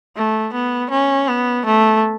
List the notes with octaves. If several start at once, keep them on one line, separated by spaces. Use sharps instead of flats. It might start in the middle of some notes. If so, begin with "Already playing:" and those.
A3
B3
C#4
B3
A3